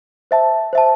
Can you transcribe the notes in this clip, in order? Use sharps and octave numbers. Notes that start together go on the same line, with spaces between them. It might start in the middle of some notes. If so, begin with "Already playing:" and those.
C5 E5 A5
C5 E5 A5